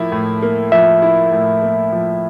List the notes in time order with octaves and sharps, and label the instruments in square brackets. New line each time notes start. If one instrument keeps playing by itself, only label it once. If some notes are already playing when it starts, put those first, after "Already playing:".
Already playing: [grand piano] A2 F3 A#3 E4
A2
A#3
[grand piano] F3 [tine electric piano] E5
[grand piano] E4
A2
A#3
F3